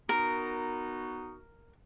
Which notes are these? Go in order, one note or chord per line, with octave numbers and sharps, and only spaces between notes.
B3 D#4 F#4 A#4